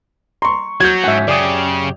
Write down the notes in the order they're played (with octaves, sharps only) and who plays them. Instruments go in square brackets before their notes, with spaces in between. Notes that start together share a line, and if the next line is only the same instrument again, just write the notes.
[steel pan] A#5 [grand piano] C6 C#6
[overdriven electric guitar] F#3 [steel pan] F#4 [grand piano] G6 G#6
[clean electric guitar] G#2 C#4 [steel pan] E5 F#5
[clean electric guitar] F#2 G4 [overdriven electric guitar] C#3 [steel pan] D5 G#5 D#6